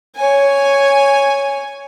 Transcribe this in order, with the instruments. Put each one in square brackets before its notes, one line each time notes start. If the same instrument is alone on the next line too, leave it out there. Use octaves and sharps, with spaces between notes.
[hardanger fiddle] C#5 G#5